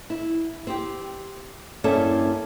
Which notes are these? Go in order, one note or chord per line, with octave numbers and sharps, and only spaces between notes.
E4
C4 G4
G2 A#3 C#4 E4 A4 E5